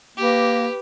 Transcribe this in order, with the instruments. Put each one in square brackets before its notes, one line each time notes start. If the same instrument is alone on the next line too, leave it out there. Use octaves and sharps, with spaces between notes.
[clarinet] A#3 [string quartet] G4 B4